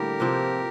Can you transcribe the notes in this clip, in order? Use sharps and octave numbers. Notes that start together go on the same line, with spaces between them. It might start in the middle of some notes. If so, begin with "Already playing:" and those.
Already playing: A2 D3 G3 A#3 G4 A#4
C3 F3 C4